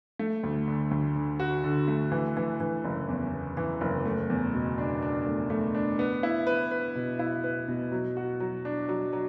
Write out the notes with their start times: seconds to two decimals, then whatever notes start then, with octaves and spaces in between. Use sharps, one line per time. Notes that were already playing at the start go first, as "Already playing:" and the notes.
0.19 A3
0.43 D2
0.68 D3
0.91 D2
1.16 D3
1.40 F#4
1.64 D3
1.88 A3
2.12 E3
2.37 E3
2.60 E3
2.85 F#1
3.09 E2
3.33 B3
3.57 E3
3.81 F#1
4.05 A3
4.30 E2
4.54 B2
4.78 D4
5.02 D4
5.26 A3
5.50 A3
5.75 D4
5.99 B3
6.23 E4
6.47 B4
6.71 B4
6.95 B2
7.19 E4
7.44 B4
7.68 B2
7.92 F#3
8.17 F#4
8.40 F#3
8.65 D4
8.89 F#3
9.13 F#3